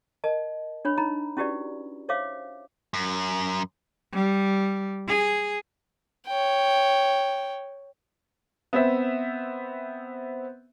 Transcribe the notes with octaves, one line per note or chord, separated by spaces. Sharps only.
A#4 D#5 A5
D4 C#5 B5
D#4 A#5 B5
C#4 E4 F#4 G4 B4 D5
C5 C#5 E5 F5 D6
F#2
G3
G#4
C#5 G5
B3 C4 E5